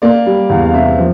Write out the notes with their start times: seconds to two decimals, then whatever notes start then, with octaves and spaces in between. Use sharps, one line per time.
0.02 A#3 D5
0.26 G3
0.50 E2 F5
0.64 F5
0.74 C3 E5
0.98 F3